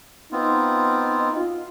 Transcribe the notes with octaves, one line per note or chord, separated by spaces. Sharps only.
B3 C4 D#4 F4
F4